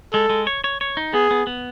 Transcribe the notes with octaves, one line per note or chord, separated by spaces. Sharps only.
G#3 A4
G#3
C#5
C#5
C#5
D#4
B3 G#4
B3
B3